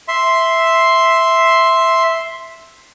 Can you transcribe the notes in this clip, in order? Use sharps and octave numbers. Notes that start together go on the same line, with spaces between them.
E5 C6